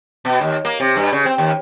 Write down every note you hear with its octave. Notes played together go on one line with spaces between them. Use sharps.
B2
D#2
A#3
C3
G2
C#3
C4
D#2